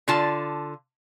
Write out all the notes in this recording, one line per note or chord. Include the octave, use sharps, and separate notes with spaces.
D3 F4 A5